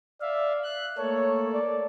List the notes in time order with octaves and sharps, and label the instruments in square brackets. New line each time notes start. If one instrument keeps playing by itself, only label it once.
[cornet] D5 [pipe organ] E5 F5
[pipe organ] F#6
[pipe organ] A3 A#3 A4 [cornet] C#5
[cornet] D5